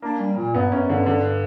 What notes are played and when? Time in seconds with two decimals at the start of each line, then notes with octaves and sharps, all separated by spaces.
0.02 A#3 D4
0.20 G3
0.37 A#2
0.54 G2 B3
0.72 F#2 C#4
0.89 G2 D3
1.06 D3